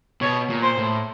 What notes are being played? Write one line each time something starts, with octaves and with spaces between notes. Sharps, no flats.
B2 C#5
A#2
C5
A2